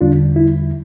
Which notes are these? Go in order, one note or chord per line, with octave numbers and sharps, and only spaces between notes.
E2 D3 G3 D4 F4
E4